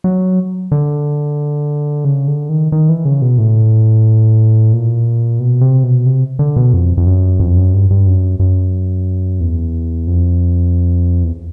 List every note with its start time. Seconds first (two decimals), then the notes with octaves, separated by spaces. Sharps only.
0.04 F#3
0.72 D3
2.05 C#3
2.27 D3
2.49 D#3
2.72 D#3
2.89 E3
3.05 C#3
3.22 B2
3.38 A2
4.73 A#2
5.39 B2
5.61 C3
5.84 B2
6.06 C3
6.39 D3
6.56 B2
6.74 F2
6.97 F2
7.07 F#2
7.40 F2
7.57 F#2
7.74 G2
7.90 G2
8.06 F#2
8.39 F#2
9.40 E2
10.07 F2
11.24 E2